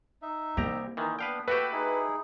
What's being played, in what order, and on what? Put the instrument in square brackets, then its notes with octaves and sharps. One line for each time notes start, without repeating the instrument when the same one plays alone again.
[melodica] D#4 E5
[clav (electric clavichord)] C2 G4 A#5 [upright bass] A#3
[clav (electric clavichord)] D#3 E3 [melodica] A#4
[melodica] B3 D4 [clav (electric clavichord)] B4 F5 G5
[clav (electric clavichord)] A3 F#4 G4 [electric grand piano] B4 [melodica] G5 E6
[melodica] D#4 E4 G#4